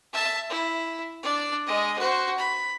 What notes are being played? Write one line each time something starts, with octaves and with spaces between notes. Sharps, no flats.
E5 A5
E4
D4 D5
G#3 D#5
F#4 C5
B5